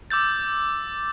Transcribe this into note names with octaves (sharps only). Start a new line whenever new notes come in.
D6 E6 G6 A6